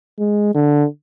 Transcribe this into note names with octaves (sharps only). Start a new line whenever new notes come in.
G#3
D3